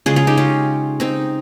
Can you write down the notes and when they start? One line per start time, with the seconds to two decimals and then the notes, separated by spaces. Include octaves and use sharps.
0.06 C#3 G#3 F4 G#4
0.16 F4 G#4
0.27 D#4 G4
0.38 C#4 F4
1.00 C4 D#4